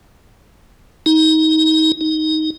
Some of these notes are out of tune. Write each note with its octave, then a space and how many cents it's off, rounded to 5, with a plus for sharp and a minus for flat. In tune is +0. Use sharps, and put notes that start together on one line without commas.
D#4 +25
D#4 +10